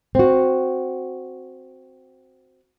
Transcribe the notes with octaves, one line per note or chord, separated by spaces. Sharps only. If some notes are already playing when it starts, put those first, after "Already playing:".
C4 F#4